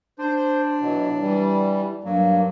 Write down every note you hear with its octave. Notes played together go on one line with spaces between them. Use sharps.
D4 C5
B2 E3 F#3
E3 G3
G2 F#3 A#3